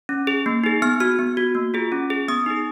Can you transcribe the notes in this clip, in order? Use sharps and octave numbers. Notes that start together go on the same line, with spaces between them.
C#4
G#4
A#3
D#4 G#4
B3 F6
F#4 F6
B3
F#4
A#3
F4 G#4
C#4
G#4
B3 D#6
D#4 G#4